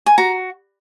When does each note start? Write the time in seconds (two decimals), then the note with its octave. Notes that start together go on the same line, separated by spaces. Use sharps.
0.06 G#5
0.18 F#4 A#5